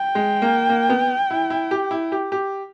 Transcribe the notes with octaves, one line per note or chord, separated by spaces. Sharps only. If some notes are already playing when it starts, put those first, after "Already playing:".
Already playing: G5
G#3
A#3
A#3
B3
E4
E4
G4
E4
G4
G4